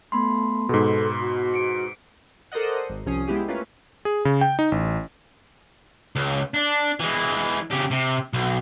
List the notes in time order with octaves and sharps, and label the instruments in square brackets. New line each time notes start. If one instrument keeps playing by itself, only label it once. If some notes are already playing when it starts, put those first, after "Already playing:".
[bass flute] A3 [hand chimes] B3 B5 C6
[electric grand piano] G#2 B2 [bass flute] A4
[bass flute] F#4
[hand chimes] C#7 D7
[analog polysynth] A4 A#4 C5 D5 D#5 F#5
G#1
C2 F3 C#4 D#6 C7
G#3 B3 E4 G4 G#4
A3 A#3 C#4 F4 B4
[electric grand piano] G#4
C#3
G5
D#4
A1
[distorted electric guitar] C#2
D4
E3 G#3
C#3 G4
C3
B1